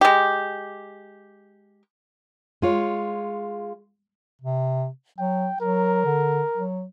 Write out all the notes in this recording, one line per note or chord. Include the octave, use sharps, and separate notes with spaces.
G#3 G4
G#3 F4 C#5
C3
F#3 G5
F#3 A#4
D3
F#3